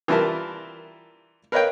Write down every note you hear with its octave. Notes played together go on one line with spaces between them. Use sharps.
E3 G3 F4 A#4 E5 A5
A#4 B4 C#5 D#5 F5 G5